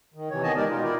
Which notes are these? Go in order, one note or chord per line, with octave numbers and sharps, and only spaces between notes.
D#3
C3 E3 C#5
D#3 B3 D#5 G#5 A5
G#3 D#4 G4 A#4 D5
B2 D#4 F4
E4 A#4 D5